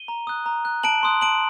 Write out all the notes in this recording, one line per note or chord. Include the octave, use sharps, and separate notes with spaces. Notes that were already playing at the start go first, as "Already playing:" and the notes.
Already playing: D#7 G7
A#5
D#6 F#6
A#5
F#6
A5 D7 F#7
C6 D#6 F#6
A5 D7 F#7